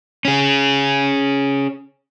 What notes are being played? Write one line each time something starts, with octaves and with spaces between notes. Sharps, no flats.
C#4 G#4